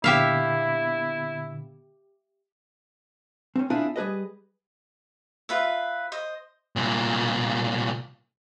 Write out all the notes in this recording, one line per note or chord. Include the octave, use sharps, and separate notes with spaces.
A#2 D3 B3 E4 G4 E5 F5
C4 C#4
B3 C4 D4 E4 F4 G#4
G3 G#4 B4 D#5
F4 B4 E5
C5 D#5
C2 A#2